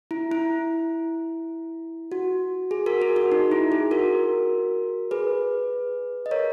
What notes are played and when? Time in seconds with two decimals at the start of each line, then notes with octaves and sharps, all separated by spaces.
0.11 E4
0.32 E4
2.12 F#4
2.71 G#4
2.86 F#4 A#4
3.02 G#4
3.16 F#4
3.32 D#4
3.52 E4
3.72 G#4
3.91 F#4 A#4
5.11 G#4 B4
6.26 D#5
6.31 A#4 C#5